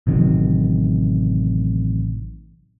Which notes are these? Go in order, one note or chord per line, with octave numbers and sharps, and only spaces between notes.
A1 C3 D#3 F#3